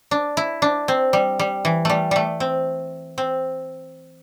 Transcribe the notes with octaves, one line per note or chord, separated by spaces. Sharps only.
D4
E4
D4
C4
G3
G3
E3
G3 A3
G3 A3
C4
C4